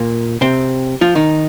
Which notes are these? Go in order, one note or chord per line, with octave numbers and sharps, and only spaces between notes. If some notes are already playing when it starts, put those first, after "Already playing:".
Already playing: A#2 A#3
C3 C4
F3 F4
D#3 D#4